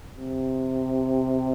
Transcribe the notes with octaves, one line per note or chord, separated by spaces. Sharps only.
C3